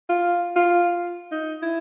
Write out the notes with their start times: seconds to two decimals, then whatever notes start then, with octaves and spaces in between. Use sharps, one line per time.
0.09 F4
0.56 F4
1.31 D#4
1.62 E4